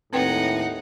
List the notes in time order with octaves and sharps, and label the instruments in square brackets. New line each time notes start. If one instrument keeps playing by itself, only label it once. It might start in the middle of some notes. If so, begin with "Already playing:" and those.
[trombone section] D#2 A2 [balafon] C4 B4 G5 [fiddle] D#4 F#5